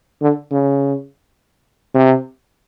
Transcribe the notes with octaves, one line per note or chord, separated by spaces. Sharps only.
D3
C#3
C3